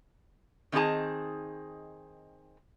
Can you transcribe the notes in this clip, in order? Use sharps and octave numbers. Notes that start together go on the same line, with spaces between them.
D#3 C4 D4 D#4 G#4 A5